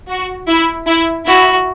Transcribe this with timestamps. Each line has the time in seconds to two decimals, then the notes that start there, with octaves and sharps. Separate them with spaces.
0.10 F#4
0.49 E4
0.88 E4
1.27 E4 F#4